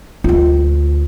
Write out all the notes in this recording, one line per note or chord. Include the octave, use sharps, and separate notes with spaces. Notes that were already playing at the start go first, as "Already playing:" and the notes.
D2 F4